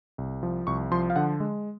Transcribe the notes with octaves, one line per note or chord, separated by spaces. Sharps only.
C2
F3
C2 C#6
F3 C6
F5
D3 F#5
G#3